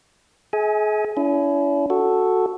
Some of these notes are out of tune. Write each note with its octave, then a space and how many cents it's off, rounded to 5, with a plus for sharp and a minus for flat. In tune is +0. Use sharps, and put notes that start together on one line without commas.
G#4 +35 E5 -45 G#5 +0
C#4 +45 E4 +20
F#4 +0 A4 +0